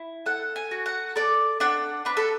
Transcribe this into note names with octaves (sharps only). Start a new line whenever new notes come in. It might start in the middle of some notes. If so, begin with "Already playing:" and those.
Already playing: E4
A4 F#5
G#5
F#4
F#5
A4 D5
D4 F#5
D4 B4
A4